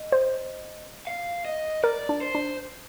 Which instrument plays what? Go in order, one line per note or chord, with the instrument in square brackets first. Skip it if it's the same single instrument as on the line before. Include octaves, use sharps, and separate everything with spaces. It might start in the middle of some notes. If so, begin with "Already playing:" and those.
Already playing: [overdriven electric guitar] D#5
[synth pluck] C5
[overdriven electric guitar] F5
D#5
[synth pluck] A#4 [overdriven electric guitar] D5
[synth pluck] D4
[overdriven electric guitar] C5
[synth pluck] D4